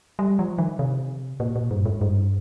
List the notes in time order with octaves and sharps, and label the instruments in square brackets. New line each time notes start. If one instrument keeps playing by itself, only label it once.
[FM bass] G3
F3
D#3
C3
A#2
A#2
G2
G#2
G2